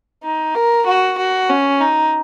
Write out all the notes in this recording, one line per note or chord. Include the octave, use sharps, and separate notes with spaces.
D#4
A#4
F#4
F#4
C#4
D#4